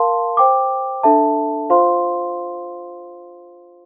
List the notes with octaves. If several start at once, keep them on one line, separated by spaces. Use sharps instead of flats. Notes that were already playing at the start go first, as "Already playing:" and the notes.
Already playing: A#4 F5 A5 C6
C5 G5 D6
D4 A4 E5 A5
F4 C5 F5 C6